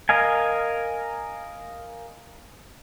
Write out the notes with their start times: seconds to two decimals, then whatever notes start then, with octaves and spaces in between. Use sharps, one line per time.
0.09 A#4 D#5 F5 G#5